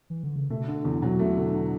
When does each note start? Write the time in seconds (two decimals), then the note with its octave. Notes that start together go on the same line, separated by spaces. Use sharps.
0.10 E3
0.24 D3
0.36 C#3
0.50 B2 A3
0.68 D3
0.85 E2
1.02 B2 F#3
1.19 A3
1.37 D3